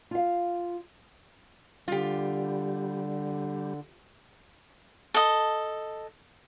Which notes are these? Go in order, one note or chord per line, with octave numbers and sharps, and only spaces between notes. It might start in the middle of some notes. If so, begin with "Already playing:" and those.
F4 F5
D3 G3 F4 G4
A4 D#5